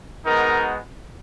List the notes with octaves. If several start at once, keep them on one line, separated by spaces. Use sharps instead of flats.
G#3 B3 D#4 F#4 A#4